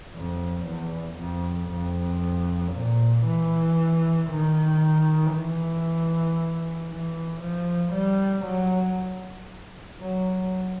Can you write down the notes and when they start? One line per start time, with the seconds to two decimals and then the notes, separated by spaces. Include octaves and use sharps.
0.15 F2
0.66 E2
1.19 F2
1.70 F2
2.74 A#2
3.27 E3
4.31 D#3
5.35 E3
6.91 E3
7.42 F3
7.93 G3
8.46 F#3
10.01 F#3